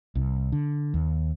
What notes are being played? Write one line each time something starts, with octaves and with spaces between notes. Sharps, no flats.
C2
D3
D#2